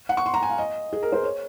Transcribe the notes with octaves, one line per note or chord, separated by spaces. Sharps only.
F#5
C#6
C6
A#5
G#5
F5
D#5
G#4
A#4
C5
C#5